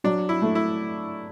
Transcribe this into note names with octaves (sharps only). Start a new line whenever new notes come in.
F#3 D4
E4
A3
E4